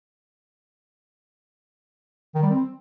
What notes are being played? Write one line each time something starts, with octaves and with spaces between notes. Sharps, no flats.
D#3
G3
C4